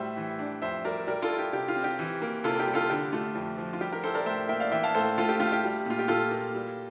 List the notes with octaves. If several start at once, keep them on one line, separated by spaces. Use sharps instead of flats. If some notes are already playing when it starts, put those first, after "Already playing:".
Already playing: A2 G3 C5 E5
E3
D4
F2 C5 E5
G3 A#4 D5
G3 A#4 D5
F4 A4
E4
G4
C3 G4
F4
C4
G4
E3
A#3
C3 F4 A4
G4
G3
F4 A4
D3 G4
A3 F4
F2
F3
F4
G3 G4
G4 A#4
E4 A4 C5
A#4 D5
A2 C5 E5
A#3 E5 G5
D5 F5
E3 E5 G5
F5 A5
A2 A4 C5
A2 F4 A4
G4
A3 F4
G4
G3
A#2 F4
G4
A#2 F4 A4
A#3
G3